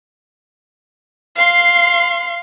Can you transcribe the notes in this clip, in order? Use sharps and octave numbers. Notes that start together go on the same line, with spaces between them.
F5 C6